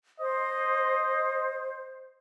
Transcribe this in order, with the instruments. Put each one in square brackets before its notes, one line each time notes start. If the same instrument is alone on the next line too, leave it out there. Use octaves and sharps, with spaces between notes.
[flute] C5 [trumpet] D#5